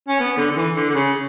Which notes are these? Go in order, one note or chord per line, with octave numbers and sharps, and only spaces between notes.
C#4
B3
D3
D3
E3
D3
D3
C#3